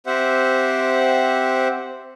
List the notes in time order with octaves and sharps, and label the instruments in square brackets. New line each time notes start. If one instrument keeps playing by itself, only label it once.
[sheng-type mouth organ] C4 G4 C5 E5 F#5